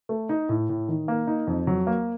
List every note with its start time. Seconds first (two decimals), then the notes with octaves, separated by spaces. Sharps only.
0.09 A3
0.29 D#4
0.49 A2
0.69 A2
0.88 D#3
1.08 A#3
1.27 D#4
1.47 F2
1.67 F#3
1.87 A#3